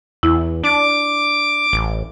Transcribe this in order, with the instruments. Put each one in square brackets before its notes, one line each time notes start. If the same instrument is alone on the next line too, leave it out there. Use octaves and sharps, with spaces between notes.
[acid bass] E2 [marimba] E4
[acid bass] D4 [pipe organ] D6
[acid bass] A1